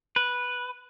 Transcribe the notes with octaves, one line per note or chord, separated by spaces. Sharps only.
B4